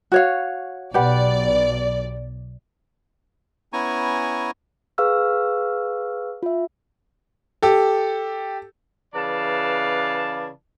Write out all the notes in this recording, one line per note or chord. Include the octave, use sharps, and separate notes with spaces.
F#4 C#5 F5
B1 G4 B4 D5 F#5
B3 C#4 E4 G#5 A#5 C#6
G#4 B4 F5 C#6 E6 F6
F4 E5
G4 A4
C#3 E3 B4 D5 F5 A5